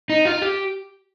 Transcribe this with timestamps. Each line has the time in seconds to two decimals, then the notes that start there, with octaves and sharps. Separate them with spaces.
0.10 D#4
0.25 F4
0.42 G4